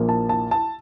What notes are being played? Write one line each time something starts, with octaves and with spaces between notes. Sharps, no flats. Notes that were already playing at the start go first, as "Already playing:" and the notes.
Already playing: A#1 A#2 F3 A#3
A5
A5
A5